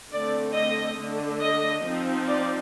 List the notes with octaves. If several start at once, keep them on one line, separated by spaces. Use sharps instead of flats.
D3 A3 C4 D5
D#5
D3 A3 D4
D#5
F3 C4 D#4
D5